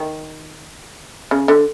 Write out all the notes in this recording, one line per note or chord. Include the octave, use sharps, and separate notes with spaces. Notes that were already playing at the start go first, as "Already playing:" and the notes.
Already playing: D#3
C#3
D3